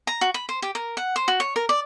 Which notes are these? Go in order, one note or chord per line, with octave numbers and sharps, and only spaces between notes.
A#5
F#4
B5
C5
G4
A#4
F#5
C5
F#4
C#5
A#4
D5